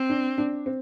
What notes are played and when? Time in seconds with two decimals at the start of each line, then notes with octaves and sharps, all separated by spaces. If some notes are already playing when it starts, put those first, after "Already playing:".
Already playing: C4
0.10 D4
0.38 D4
0.66 C4